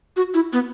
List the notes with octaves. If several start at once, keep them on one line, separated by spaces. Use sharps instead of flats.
F#4
E4
B3